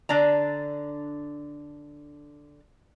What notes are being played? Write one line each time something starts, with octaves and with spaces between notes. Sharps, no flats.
D3 D4 D5 A#5